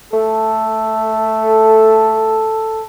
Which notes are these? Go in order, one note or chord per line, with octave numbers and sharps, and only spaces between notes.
A3 A4